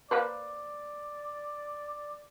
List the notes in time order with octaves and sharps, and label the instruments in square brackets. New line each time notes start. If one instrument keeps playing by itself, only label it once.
[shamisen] A#3 B4 C5 [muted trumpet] D5